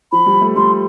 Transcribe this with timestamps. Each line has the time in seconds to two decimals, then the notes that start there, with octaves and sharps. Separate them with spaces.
0.12 F3 B5
0.26 G3
0.42 A3
0.56 G3 C6